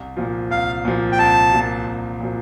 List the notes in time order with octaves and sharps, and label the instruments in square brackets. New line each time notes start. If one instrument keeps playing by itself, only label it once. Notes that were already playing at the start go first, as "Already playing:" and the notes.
Already playing: [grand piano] C2
A#2 F3
[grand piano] C2 [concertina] F5
[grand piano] A#2 F3
[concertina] G5
[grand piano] C2 [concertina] A5
[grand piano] A#2 F3
C2
A#2 F3